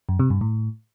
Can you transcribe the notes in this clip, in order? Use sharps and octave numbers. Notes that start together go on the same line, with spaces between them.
F#2
C3
G2
A2